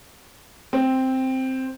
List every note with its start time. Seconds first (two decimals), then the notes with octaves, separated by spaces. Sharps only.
0.73 C4